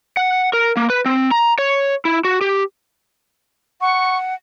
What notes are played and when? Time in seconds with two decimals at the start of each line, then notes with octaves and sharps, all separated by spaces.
0.17 F#5
0.53 A#4
0.77 A#3
0.90 B4
1.06 C4
1.31 A#5
1.58 C#5
2.05 E4
2.25 F#4
2.41 G4
3.81 F#5 C#6